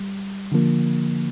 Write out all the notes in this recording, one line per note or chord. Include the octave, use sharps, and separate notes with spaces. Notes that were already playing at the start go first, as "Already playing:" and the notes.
Already playing: G3
D3 F3 A#3